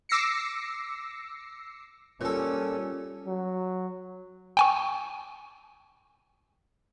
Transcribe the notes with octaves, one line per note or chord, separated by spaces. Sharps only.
D6 E6 A#6 C7 C#7
A#2 G3 C#4 A4
F#3
G5 G#5 C#6